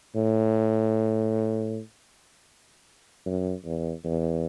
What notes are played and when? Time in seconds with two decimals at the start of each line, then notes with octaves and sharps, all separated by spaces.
0.15 A2
3.26 F#2
3.65 E2
4.05 E2